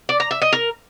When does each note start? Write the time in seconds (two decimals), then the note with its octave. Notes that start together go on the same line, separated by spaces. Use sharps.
0.09 D5
0.20 A#5
0.31 E5
0.42 D#5
0.52 A#4